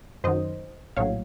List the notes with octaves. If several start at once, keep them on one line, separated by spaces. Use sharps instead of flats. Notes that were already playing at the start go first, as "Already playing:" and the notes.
F#2 D#3 F#3 C5 D#5
A#1 A2 F#3 C#5 F5